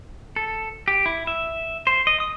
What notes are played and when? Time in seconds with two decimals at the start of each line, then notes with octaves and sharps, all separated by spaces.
0.36 A4
0.88 G4
1.06 E4
1.27 E5
1.87 C5
2.07 D#5
2.20 D#6